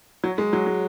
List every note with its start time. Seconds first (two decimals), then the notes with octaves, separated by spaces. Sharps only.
0.24 F#3
0.38 G#3
0.53 F#3
0.67 G#3